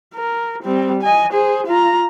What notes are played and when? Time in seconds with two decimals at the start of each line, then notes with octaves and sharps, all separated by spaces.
0.15 A#4
0.63 G3 C4
1.03 D#5 G#5
1.32 G#4 C5
1.67 F4 A#5